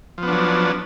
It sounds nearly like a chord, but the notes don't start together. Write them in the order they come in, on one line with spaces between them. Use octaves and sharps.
F3 B3 D4 F#3